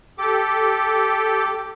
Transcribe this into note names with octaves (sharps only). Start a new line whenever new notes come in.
G4 A4 D6